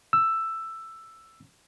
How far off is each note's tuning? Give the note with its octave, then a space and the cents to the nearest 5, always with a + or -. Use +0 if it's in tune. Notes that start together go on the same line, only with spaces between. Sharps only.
E6 +5